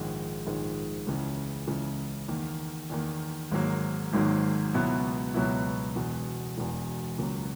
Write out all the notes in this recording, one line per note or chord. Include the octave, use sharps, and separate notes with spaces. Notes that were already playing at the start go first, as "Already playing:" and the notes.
Already playing: A#1 G#2 D#3 G#3
A#1 G#2 D#3 G#3
C#2 C#3 E3
C#2 C#3 E3
E2 D#3 A#3
E2 D#3 A#3
G#1 G#2 D#3 F#3 A#3
G#1 G#2 D#3 F#3 A#3
C#2 B2 F#3 B3 E4
C#2 B2 F#3 B3 E4
E1 E2 B2
E1 E2 B2
C#2 C#3 F#3 A#3